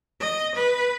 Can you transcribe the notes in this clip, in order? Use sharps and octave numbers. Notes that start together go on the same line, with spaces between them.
D#5
B4